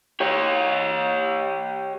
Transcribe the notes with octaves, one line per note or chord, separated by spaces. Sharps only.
G4 C#5